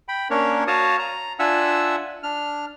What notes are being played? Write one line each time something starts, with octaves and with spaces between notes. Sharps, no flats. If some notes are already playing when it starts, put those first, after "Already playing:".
G5 B5
A#3 C#4 D4 A#4 C#5
F#4 C#5 F5 A5 D#6
A#5
D4 F4 E5 F#5 G#5 E6
D4 F6